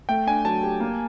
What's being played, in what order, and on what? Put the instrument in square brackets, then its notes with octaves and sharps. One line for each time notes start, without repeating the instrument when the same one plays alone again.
[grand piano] A3 [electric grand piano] G5
[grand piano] D4 [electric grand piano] G#5
[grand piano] F#3 [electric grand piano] A5
[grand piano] G4
A#3